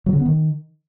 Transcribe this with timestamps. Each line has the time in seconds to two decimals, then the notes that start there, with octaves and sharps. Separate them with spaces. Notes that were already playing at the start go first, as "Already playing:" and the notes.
0.06 F#3
0.13 C#3
0.19 B3
0.26 D#3